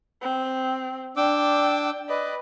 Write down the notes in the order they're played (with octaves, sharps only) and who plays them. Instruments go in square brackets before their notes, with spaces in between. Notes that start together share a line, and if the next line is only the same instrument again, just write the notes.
[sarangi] C4
[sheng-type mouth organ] D4 D6 E6 [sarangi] G5
[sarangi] B4 [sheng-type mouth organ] D5 D#5